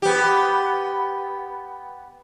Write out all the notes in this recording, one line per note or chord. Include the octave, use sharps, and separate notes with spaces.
B3 G4